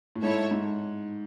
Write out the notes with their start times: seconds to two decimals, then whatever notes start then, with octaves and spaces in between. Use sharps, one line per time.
0.16 A2
0.22 G#2 A3 E4 A4 C#5 E5
0.51 G#2